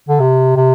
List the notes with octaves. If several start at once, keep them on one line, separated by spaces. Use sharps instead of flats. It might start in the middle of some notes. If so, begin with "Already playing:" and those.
D3
C3
C3